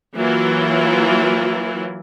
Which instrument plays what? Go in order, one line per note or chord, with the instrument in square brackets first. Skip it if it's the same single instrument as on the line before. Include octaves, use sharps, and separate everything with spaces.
[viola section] E3 F#3 A#3 E4 F4